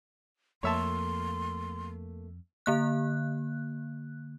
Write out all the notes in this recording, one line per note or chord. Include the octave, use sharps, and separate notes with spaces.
F2 A3 A#3 C#5 E5 A5 C6
D3 A#3 F#6